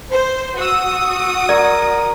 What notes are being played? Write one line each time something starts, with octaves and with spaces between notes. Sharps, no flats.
C5
F#4 F#5 D#6 E6
A#4 D5